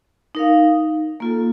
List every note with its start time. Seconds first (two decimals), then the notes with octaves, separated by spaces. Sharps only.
0.35 D#4 A#4 F5
1.20 A#3 F4 A4